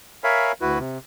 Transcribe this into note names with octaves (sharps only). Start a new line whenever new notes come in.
A#4 C#5 E5 F5 G#5 B5
D2 E4 F#4 B4
C3